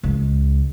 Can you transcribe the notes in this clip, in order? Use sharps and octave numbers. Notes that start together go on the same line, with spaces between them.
C#2